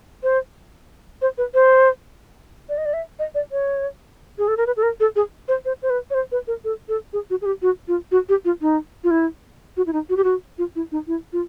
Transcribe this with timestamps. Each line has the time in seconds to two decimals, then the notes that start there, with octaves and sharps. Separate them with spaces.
0.23 C5
1.22 C5
1.38 B4
1.54 C5
2.69 D5
2.78 D#5
2.86 D5
2.94 E5
3.19 D#5
3.35 D5
3.52 C#5
4.38 G#4
4.48 A4
4.57 A#4
4.67 B4
4.77 A4
4.83 A#4
5.00 A4
5.16 G#4
5.48 C5
5.65 C5
5.82 C5
5.90 B4
6.10 C#5
6.14 C5
6.32 B4
6.47 A#4
6.64 A4
6.89 A4
7.13 G#4
7.30 F#4
7.42 G#4
7.46 G4
7.62 F#4
7.88 F4
8.12 F#4
8.29 G4
8.45 F4
8.62 D#4
9.04 F4
9.11 E4
9.77 F#4
9.86 E4
9.93 D#4
10.09 F#4
10.17 G4
10.24 F#4
10.58 F4
10.76 E4
10.92 D#4
11.07 E4
11.33 F4